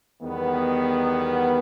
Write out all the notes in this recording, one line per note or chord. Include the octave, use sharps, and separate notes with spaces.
E2 D#3 G3 B3
A#4